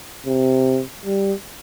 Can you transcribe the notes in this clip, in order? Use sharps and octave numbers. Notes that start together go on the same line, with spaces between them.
C3
G3